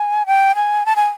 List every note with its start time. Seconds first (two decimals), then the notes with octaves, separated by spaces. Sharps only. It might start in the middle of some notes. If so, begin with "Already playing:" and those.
Already playing: G#5
0.26 G5
0.55 G#5
0.86 A5
0.96 G#5